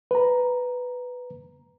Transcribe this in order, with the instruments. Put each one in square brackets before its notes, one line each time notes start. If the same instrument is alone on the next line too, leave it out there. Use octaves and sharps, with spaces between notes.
[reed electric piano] B4 A#5